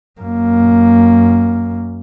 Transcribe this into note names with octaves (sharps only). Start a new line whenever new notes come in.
F#2 A#3